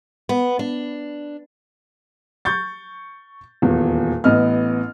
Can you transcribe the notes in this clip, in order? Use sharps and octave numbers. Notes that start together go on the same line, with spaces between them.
B3
D4
C#6 G6 A6
D#1 E2
A1 B3 D#5 F6